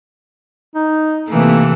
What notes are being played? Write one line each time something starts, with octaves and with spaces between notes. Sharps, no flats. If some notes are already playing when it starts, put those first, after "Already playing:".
D#4
C3 E3 A3 A#3